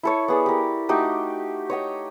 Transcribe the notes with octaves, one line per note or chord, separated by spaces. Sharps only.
E4 A4 C#5
B3 G#4 D5
G4 A#4
A3 D#4 F#4 G4
C#5 D#5 G5